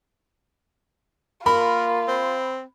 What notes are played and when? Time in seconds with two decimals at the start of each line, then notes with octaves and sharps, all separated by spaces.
1.46 A#3 F4 A#4 B5
2.08 C4